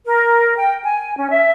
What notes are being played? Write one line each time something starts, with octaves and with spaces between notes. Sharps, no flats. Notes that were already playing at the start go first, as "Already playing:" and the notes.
A#4
G5
G#5
C#4
E5